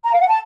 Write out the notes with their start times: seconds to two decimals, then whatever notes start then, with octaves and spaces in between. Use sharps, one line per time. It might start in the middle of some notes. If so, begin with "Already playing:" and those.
0.04 A#5
0.12 F5
0.21 F#5
0.28 A5